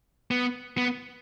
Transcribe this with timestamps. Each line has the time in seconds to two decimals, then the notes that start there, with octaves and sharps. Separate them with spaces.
0.31 B3
0.77 B3